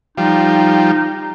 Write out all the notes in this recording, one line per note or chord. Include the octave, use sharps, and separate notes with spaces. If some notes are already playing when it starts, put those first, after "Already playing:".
F3 G3 D#4